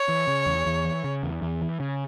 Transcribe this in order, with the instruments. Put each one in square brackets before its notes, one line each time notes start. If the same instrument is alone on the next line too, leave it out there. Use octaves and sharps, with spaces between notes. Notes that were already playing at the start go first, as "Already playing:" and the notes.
Already playing: [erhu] C#5
[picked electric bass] E3
C#3
E2
E2
E3
C#3
E2
E2
E3
C#3